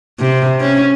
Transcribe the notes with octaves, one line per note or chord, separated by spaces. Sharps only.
C3
C#4